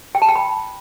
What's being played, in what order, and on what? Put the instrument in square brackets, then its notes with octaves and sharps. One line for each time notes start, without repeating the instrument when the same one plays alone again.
[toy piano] G5
A5
G5
B5